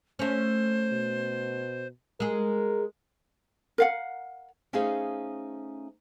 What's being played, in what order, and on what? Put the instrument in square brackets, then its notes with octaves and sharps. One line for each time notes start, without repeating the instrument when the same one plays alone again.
[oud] A3 C#4 [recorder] C5
[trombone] B2
[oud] G#3 G#4 [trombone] A#4
[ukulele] A#4 F5 F#5
[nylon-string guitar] A3 C#4 D#4 G#4 C5 F5